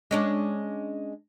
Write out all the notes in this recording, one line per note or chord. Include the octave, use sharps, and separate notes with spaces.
G#3 C#4 D4